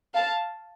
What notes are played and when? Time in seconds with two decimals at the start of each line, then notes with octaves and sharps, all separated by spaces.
0.15 F5 A5